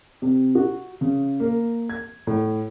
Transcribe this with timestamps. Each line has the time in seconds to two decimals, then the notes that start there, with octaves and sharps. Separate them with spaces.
0.22 C3
0.55 F#4
1.01 C#3
1.40 A#3
1.89 G#6
2.27 A2